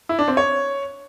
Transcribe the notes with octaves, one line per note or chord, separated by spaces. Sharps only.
E4
D4
C4
C#5